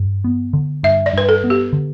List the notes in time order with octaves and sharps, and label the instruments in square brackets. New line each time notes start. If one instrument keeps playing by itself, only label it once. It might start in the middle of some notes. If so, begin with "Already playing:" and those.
Already playing: [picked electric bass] G2
B3
D3
[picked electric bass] G2 [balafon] E5
[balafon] D5
[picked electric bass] G2 [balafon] B4
[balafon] A4
[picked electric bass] B3
[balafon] G4
[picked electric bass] D3